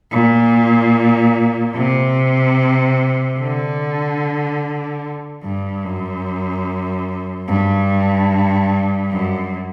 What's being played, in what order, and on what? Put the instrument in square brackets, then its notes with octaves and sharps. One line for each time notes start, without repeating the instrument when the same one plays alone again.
[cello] A#2
C3
D3
G2
F#2
G2
F#2